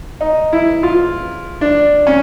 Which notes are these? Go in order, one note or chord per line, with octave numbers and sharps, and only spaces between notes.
D#4
E4
F4
D4
C#4